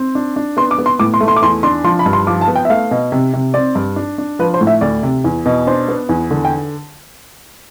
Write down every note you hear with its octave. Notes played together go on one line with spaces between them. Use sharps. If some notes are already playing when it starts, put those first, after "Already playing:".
Already playing: C4
D4
D4
B3 C6
D6
B3
C6
A2 D6
C6
A3
C6
D6
E2 C6
D4 C6
F3 C6
B5
G2
C6
F3 D6
A5
B3
G5
E5
A3 F5
B2
C3
C3
C4 D5
G2
D4
D4
F3 B4
C5
A2
E5
D2 D5
C3
E2
B2
D4 C5
B3
E2
D3
G5